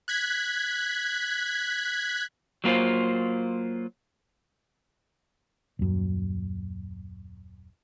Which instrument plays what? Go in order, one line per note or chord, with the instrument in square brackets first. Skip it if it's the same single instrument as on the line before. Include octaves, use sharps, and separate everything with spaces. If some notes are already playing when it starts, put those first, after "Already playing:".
[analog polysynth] F#6 G#6 B6
[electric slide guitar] F#3 A#3 F4 C5
[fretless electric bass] D#1 F#2